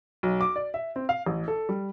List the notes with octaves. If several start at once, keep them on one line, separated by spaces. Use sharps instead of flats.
B1
D6
D5
E5
C4
F5
A1
A4
G3